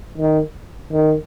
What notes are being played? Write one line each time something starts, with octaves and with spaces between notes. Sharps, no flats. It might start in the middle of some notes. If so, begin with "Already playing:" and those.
D#3
D#3